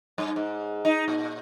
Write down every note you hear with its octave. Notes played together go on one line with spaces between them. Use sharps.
G2
G#2
D#4
A#2